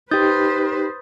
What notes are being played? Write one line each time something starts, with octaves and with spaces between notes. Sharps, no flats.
D#4 G4 B4 C5 D#6 G6 A6